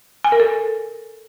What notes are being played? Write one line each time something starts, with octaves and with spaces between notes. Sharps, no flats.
G#5
A#4
A4